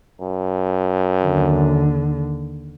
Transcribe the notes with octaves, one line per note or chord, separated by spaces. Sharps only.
F#2
D#2 D3